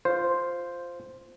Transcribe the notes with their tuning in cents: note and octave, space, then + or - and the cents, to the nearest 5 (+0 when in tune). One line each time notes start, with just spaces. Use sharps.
F4 +0 C5 +0